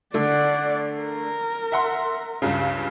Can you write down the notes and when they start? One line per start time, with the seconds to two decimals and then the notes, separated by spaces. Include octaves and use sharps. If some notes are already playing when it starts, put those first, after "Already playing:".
0.14 D3 A3 D5 F#5
1.01 A#4
1.72 E5 F#5 C6
2.42 C#2 G2 C#3